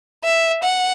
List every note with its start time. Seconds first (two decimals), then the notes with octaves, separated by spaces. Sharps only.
0.24 E5
0.63 F#5